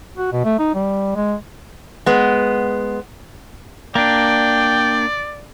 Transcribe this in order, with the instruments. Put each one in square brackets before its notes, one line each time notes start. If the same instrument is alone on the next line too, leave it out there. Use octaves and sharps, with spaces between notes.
[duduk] F#4
B2
A3
D#4
G3
G#3
[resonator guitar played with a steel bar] G#3 B3
[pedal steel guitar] A#3 D4 [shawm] D5 [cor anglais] G5